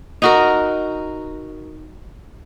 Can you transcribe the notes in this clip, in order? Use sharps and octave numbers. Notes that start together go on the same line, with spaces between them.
D#4 F#4 A#4